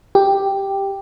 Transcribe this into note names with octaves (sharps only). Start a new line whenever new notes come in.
G4